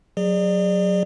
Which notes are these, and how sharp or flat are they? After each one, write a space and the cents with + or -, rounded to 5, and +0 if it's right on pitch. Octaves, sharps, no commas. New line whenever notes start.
F#3 +0 G#4 -20 D5 +35